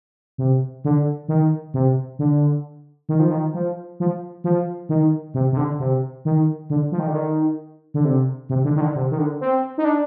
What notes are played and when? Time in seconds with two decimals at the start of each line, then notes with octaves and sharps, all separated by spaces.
0.38 C3
0.84 D3
1.28 D#3
1.74 C3
2.19 D3
3.09 D#3
3.20 F3
3.31 D#3
3.54 F3
4.00 F3
4.44 F3
4.89 D#3
5.34 C3
5.52 C3
5.57 D3
5.80 C3
6.25 D#3
6.70 D3
6.92 F3
6.99 D#3
7.07 D3
7.15 D#3
7.94 D3
8.05 C3
8.49 C3
8.64 D3
8.76 D#3
8.81 D3
8.96 C3
9.11 D#3
9.18 D3
9.41 C4
9.78 D#4
9.85 D4